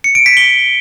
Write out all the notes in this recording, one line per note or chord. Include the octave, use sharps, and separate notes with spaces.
C#7
D7
B6
G7